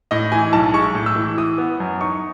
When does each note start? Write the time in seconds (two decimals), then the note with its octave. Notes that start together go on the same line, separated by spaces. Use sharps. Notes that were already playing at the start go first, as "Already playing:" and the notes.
0.11 A2 D#5
0.32 E3 G#5
0.53 B1 A5
0.74 G#3 C#6
0.95 A2
1.06 E6
1.16 E3
1.38 E3 D#6
1.58 B3
1.80 F#2
2.01 D#4 C#6